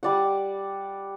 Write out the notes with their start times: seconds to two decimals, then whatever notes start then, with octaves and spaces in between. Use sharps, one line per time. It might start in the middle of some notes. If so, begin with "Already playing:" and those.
0.03 G3 D5 F#5